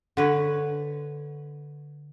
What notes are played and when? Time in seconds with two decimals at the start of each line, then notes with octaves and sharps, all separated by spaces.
0.17 D3 B4 C#5